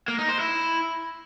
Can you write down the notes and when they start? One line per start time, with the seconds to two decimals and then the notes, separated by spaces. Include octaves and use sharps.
0.08 A#3
0.19 D#4
0.29 C5
0.39 E4